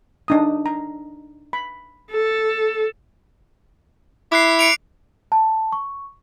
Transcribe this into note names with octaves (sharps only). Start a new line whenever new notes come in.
D4 D#4 D#6
A#5
B5
A4
E4 D6 F#6 C7
C#7 D7 F7
A5
C#6